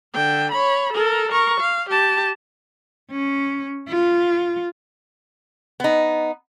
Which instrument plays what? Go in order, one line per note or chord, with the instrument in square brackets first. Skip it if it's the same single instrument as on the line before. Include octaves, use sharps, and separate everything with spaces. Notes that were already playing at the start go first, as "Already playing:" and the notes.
[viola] D3 G5
C#5 B5
A4 A#4
A#4 C#6
F5
G4 A5
[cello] C#4
F4
[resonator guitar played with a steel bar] B3 D#4